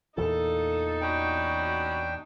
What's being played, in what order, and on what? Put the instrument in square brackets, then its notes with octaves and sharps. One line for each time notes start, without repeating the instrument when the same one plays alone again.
[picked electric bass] E2 A#2 E3 [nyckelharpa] D#4 [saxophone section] A4
[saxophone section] B3 C#4 F#4 [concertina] D4 G5